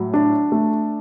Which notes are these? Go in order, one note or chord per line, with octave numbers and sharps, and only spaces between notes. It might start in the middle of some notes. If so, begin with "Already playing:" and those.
Already playing: A2 F#3
D4
A3